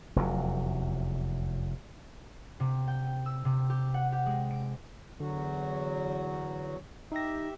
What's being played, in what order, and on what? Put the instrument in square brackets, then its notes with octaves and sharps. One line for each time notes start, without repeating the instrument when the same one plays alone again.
[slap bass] F1 E2 F#3
[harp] C3
G5
E6
C3
G4
F#5
G4
G#3
D7
[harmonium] E2 F#3 F#4 [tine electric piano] D3
[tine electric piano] D#4 A#6 [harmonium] G4 E5